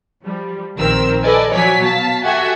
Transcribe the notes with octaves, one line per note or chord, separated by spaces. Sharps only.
F3 G3
A#1 D#3 F3 C4 A#4 E6
A4 B4 D5 D#5 G#5
F3 F#3 C#5 D5 G#5 B6
B2 F5 A5 B6
F#4 G4 A4 E5 F#5 G#5